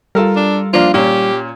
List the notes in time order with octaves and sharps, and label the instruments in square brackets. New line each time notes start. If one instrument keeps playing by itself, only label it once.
[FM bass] G3 [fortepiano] F4 A4 A#4
[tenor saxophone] D4
[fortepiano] F3 A#3 D4 [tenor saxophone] F4
[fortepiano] A#2 C#4 [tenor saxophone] G4